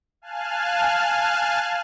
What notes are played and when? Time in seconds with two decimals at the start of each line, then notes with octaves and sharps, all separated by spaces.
0.22 F5 G#5 A5 F6 F#6